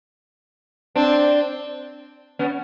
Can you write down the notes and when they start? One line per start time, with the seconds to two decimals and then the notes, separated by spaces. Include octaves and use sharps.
0.96 C4 D4
2.39 B3 C#4